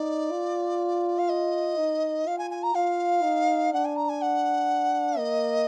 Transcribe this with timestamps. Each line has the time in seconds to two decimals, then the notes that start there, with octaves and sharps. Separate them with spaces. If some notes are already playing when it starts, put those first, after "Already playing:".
Already playing: D#4 D5
0.32 F4
1.18 F5
1.29 D#5
1.77 D#4
2.26 F4 F5
2.38 G#5
2.50 G#5
2.63 A#5
2.75 F4 F5
3.23 D#4
3.73 D4 F#5
3.85 G#5
3.96 A#5
4.09 G#5
4.21 F#5
5.18 A#3 D#5